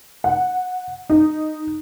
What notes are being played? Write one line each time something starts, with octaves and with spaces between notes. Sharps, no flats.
F#5
D#4